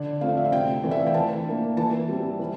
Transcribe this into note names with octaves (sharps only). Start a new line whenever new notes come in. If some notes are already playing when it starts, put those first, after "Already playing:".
Already playing: D3 D5
F3 A3 C4 F5
D5
E5
F5
C3 G5
E3 A3 C4 D5
E5
F5
G5
E3 A5
A#3 D4
E3 A5
G3 C4
E3